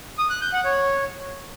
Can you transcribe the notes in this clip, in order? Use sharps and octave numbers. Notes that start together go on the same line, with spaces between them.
D#6
F#6
G6
F#5
C#5